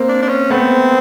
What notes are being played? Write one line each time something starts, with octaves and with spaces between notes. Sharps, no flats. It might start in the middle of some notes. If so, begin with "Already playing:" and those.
Already playing: A#3 C4
D4
D4
C#4
A3 B3 C4